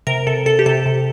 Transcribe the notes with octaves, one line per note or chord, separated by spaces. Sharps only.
C3 A#4
C3 A4
C3 A4
G4
C3 A4
C3